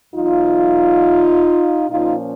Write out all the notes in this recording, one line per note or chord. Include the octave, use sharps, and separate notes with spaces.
E2 B2 F#3 D#4 F4
A#2 F3 A#3 C#4 D#4 F4